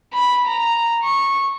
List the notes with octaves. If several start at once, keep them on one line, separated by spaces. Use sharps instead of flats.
B5
A#5
C#6